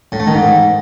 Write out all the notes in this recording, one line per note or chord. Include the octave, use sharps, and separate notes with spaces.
A2
A3
D#3
G#2